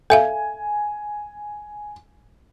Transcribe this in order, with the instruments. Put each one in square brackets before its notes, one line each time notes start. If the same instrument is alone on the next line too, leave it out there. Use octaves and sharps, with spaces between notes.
[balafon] A4 E5 F5 [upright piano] G#5